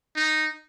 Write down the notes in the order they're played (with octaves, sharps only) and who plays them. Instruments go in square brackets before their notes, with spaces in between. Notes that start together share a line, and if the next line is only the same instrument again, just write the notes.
[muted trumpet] D#4